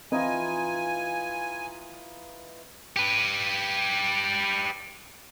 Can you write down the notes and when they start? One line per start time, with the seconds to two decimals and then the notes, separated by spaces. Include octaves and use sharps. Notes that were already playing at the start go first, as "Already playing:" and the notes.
0.12 E3 C4 D#4 F4 A4 D#5 G#5
2.96 G4 B4